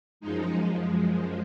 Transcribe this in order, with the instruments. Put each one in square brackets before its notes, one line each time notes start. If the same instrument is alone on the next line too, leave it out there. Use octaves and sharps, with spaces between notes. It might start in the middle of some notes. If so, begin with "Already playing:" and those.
[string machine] F#2 F3 G#3 D#4